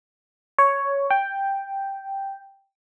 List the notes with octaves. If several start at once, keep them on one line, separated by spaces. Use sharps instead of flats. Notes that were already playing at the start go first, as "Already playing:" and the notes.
C#5
G5